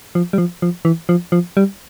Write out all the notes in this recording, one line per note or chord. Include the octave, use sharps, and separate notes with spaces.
F3
G3
F3
F3
E3
F3
F3
G3